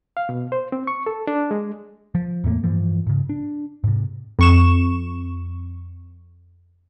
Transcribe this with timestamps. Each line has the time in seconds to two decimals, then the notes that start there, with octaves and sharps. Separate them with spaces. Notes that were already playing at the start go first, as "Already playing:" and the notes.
0.17 F5
0.29 B2
0.52 C5
0.72 C4
0.87 C#6
1.06 A4
1.27 D4
1.51 G#3
2.15 F3
2.44 E2 A2 A3 A#3
2.64 G2 E3 F3
3.07 G#2 C#3
3.29 D4
3.84 G#2 C3
4.39 F2 C#6 E7